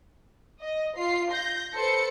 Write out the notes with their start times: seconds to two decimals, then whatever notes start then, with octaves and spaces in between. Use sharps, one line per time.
0.62 D#5
0.97 F4 C7
1.32 G6 A#6
1.74 A4 B4 C5 C#7